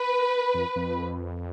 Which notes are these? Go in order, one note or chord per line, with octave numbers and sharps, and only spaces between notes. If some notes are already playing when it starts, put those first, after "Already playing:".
Already playing: B4
F2
F2